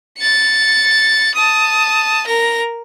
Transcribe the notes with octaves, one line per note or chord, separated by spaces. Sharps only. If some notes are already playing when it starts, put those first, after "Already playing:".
A6 C#7
A5 D#6
A#4 A#6